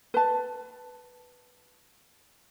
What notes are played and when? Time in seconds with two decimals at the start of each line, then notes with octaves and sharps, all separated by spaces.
0.14 B4 A5